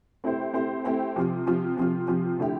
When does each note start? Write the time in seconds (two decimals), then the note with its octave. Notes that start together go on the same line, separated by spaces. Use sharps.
0.24 A3 C4 E4 G4 C5
0.54 A3 C4 E4 G4 C5
0.84 A3 C4 E4 G4 C5
1.16 C3 F3 C4 F4
1.47 C3 F3 C4 F4
1.77 C3 F3 C4 F4
2.08 C3 F3 C4 F4
2.39 D3 A3 E4 G4